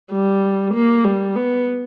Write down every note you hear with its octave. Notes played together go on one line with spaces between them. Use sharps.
G3
A#3
G3
B3